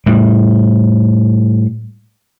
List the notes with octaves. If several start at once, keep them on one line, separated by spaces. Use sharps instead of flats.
A2 G3